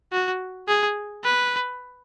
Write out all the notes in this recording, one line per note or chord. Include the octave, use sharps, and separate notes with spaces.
F#4
G#4
B4